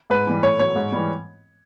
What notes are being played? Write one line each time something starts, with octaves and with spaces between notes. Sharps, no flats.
G#2 B4
E3 G3
A2 C#5
F#3 C#5
G#2
E3 G3